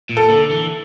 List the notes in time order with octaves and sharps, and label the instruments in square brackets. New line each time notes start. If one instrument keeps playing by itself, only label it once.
[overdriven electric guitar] A#2
[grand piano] A4
[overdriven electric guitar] D3
E3